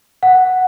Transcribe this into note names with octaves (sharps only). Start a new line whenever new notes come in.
F#5